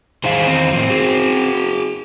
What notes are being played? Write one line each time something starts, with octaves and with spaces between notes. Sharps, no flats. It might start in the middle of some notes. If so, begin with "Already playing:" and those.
E2 D#3 G#4 C5 F5
C4
A2 F3
F#4 G#4